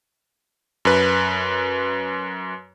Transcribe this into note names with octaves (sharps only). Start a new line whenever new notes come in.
F#2 B4